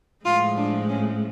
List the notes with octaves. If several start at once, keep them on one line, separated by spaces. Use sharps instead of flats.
A2 F3 G#3 F4
D4
C#4